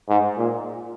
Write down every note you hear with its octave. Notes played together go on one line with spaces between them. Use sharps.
G#2
A#2